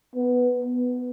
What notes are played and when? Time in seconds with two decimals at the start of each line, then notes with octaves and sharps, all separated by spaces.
0.15 B3
0.64 B3